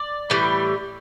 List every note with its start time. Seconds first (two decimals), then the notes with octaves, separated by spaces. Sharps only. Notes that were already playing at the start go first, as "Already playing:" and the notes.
Already playing: D5
0.30 A2 E3 G3